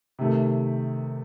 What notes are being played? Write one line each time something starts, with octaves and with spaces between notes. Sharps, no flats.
C3 D#3 A3